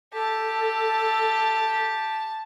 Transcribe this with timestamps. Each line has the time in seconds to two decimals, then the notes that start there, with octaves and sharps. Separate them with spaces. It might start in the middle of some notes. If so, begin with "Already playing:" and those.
0.14 G4 A4 A5